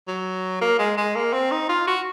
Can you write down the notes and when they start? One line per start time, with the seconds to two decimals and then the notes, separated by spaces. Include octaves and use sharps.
0.07 F#3
0.61 A#3
0.79 G#3
0.97 G#3
1.15 A#3
1.33 C4
1.51 D#4
1.69 F4
1.87 F#4